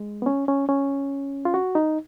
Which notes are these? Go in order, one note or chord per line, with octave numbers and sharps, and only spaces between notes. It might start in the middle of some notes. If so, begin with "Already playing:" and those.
Already playing: G#3
B3
C#4
C#4
C#4
F4
F#4
D#4